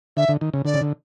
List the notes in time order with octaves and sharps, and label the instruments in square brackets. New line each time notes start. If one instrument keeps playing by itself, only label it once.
[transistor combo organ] D3 [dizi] E5
[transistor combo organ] D3
D#3
C#3
[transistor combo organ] D3 [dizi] D5
[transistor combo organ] C#3
D3